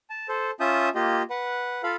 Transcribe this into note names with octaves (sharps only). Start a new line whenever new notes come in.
A5
A4 C5
C#4 F4 E5 A5 D#6 G6
A#3 F4 G4 D#5
B4 F#5
F4 A4 F5 B5